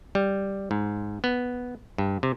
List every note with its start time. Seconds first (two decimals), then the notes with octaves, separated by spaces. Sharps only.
0.15 G3
0.71 G#2
1.24 B3
1.98 G2
2.23 C3